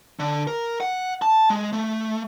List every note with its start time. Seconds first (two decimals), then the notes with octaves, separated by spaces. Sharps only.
0.20 D3
0.47 A#4
0.81 F#5
1.22 A5
1.50 G#3
1.73 A3